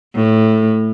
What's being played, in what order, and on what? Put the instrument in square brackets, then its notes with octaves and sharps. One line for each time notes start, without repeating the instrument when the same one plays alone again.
[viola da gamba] A2